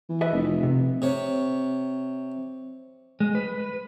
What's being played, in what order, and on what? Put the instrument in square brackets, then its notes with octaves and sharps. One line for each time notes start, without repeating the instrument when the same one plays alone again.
[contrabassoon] E3
[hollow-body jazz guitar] B4 D#5 E5
[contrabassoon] F1
[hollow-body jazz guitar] C3
[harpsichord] C3 C#5
[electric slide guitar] G#3
B4